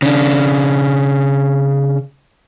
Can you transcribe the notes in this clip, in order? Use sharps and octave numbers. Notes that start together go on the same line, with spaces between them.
C#3 D4